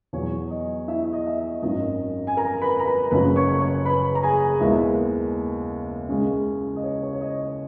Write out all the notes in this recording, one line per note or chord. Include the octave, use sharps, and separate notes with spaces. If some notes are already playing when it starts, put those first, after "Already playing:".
E2 B2 F#3 C#5
D#5
E4 E5
E5
D#5
E5
D#5
G#1 F#2 D#3 D#5
G#5
A#4 A#5
B4 B5
A#5
B4 B5
F#1 F#2 C#3 F#3 B4 B5
C#5 C#6
C#5 C#6
B4 B5
A#5
G#4 G#5
D#2 D#3 G#3 B3 E4 E5
C#2 C#3 G#3 C#4
D#5
C#5
C#5
C#5
D#5